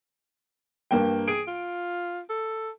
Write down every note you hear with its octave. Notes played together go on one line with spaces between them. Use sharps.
G2 A#3 G5
G#4 D7
F4
A4